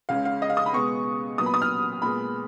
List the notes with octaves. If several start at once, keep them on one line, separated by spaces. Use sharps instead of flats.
C#2 C#3 G#3 C#4 F5
F5
D#5
F5
D#6
B5
B2 G#3 B3 C#6
A#2 F#3 B3 D#6
B5
D#6
F6
A#2 G#3 B3 B5